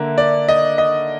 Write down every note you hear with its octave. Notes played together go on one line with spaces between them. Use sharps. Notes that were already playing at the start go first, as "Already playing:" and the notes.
Already playing: D3 A#3 E5
D5
D#5
D#5